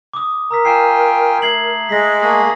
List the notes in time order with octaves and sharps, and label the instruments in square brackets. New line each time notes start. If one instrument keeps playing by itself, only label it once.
[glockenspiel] D6 D#6
[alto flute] A#4 [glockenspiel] A#5 E6 B6
[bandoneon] F4 G5 G#5 [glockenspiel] C7 E7
[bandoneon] A3 [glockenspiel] G#6 C7 F#7
[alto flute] G#3 [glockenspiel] A#6 B6
[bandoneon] A3 A#3 G#4